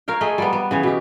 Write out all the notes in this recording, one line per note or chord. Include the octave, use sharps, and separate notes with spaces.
A#4 C#5 F5 G5
A3 G#4 D#5
G3 A#3 B3
B3
C#3 E3 C#5
B2 G4